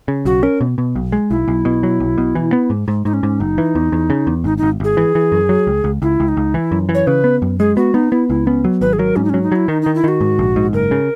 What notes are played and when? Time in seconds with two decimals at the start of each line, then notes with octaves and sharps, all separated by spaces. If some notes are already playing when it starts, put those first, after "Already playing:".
0.08 C#3
0.25 B1 F#4
0.43 C#4 A#4
0.61 B2
0.78 B2
0.95 B1
1.12 G#3
1.30 B1 E4
1.48 B1
1.65 B2
1.83 F#3
2.00 B1
2.18 B2
2.35 E3
2.53 B3
2.70 G#2
2.88 G#2
3.05 G#2 D#4
3.14 C#4
3.23 G#2
3.40 F#1 D#4
3.58 E3
3.75 E2
3.92 E2
4.10 C#3
4.27 E2
4.44 G#1 D#4
4.58 G#1 D#4
4.80 G#1 G#4
4.97 E3
5.15 E3
5.32 F#2
5.49 F#3
5.67 C#2
5.84 C#2
6.02 C#2 E4
6.20 C#2
6.28 D#4
6.37 C#2
6.54 E3 E4
6.72 F#2
6.89 E3
6.94 C#5
7.07 C#3 B4
7.24 B3
7.42 F#2
7.59 G#3 G#4
7.76 B3 F#4
7.94 B3 D#4
8.12 B3 E4
8.29 C#2 E4
8.46 B3 C#4
8.64 F#3
8.81 G#1 B4
8.93 G#4
8.99 F#3 A#4
9.16 G#2 C#4
9.25 D#4
9.29 F#3 C#4
9.43 D#4
9.52 F#3 E4
9.68 D#3 D#4
9.82 D#3 D#4
9.95 E4
10.04 D#3 F#4
10.21 G#2
10.39 A#1
10.56 G#2
10.73 F#1 A#4
10.91 C#3